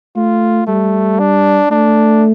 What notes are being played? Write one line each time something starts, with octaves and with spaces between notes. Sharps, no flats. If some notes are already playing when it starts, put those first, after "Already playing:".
A3 F4
G3 A3
D4
A3 D4